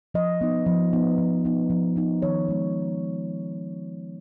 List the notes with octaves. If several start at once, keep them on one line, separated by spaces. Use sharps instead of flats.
F3 D#5
B3 D#4
F3
B3 D#4
F3
B3 D#4
F3
B3 D#4
D#3 C#5
G#3 B3 D#4